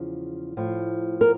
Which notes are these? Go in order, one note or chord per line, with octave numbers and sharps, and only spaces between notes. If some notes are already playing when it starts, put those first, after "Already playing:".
Already playing: E2 C#3 F3
A2 F3
A#4